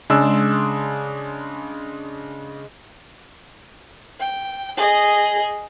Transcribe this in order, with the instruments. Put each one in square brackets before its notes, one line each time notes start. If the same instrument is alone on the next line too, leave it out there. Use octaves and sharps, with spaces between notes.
[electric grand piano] C#3 D4 E6 [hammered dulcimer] G#3
[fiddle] G5
G#4 D#5